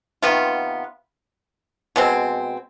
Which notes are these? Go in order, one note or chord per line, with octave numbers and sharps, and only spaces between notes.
C3 D#3 B3 F4
B2 G#3 C4